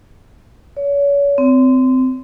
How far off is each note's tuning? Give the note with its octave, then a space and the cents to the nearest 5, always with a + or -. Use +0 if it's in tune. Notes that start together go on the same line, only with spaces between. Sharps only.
C#5 +35
C4 -20